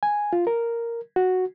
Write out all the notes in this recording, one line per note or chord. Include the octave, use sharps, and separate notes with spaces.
G#5
F4
A#4
F#4